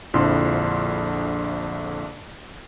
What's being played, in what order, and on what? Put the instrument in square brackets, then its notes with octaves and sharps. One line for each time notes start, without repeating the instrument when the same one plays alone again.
[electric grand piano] A#1 F2 D3 F3 E4 C6